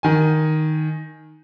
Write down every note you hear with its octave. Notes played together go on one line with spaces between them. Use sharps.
D#3 G#5